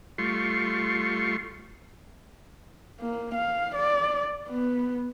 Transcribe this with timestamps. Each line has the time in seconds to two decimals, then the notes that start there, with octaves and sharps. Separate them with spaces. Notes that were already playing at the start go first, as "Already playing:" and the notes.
0.18 G3 A3 F4 C6 C#6
3.01 A#3
3.35 F5
3.75 D5
4.49 B3